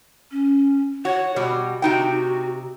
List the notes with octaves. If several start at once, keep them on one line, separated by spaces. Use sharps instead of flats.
C#4
F#4 C#5
B2 G3 F#4
C3 D#4 F#4 G5